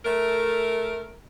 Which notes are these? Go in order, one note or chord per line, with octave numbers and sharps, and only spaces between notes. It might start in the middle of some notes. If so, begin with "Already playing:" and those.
A3 A#4